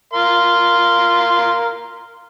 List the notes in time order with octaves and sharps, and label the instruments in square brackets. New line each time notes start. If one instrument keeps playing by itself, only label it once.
[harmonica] A#4 F5 C6